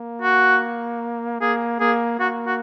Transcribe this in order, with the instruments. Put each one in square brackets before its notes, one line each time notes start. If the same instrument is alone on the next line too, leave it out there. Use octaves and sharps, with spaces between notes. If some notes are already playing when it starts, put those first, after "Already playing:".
Already playing: [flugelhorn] A#3
[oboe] F#4
[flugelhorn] A#3 [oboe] G#4
[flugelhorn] A#3 [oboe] G#4
[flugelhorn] A#3 [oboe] F#4
[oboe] F#4